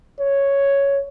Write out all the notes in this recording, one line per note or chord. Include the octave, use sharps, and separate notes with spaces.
C#5